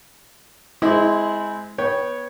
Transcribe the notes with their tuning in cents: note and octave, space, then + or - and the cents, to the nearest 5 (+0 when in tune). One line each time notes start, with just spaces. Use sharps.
G#3 +5 C4 -20 E4 -15
B3 -15 C#5 +0 G5 +0